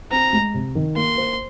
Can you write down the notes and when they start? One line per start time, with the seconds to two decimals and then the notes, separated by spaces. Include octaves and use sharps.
0.11 C4 A#5
0.33 G#3
0.54 C3
0.75 D#3
0.96 A#3 C6
1.17 C5